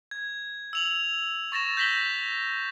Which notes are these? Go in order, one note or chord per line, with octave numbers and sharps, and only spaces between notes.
G#6
E6 F7 F#7
C#6 A6 A#6 E7
G6 A#6 B6 F#7 G7